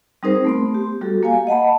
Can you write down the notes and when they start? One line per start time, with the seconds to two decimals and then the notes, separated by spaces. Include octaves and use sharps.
0.23 G3 C4 D#4 G#4 A#4 C5
0.45 A3 B3 C6
0.74 G4
1.01 G3 F#4 G4 A4
1.23 A#3 F5 G#5
1.47 D#5 F#5 A5 B5